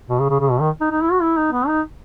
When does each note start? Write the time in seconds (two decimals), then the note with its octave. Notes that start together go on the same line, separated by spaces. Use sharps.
0.09 B2
0.19 C#3
0.30 C#3
0.40 C#3
0.50 B2
0.60 D#3
0.81 D#4
0.91 D#4
1.02 E4
1.12 F#4
1.22 E4
1.37 D#4
1.52 B3
1.67 D#4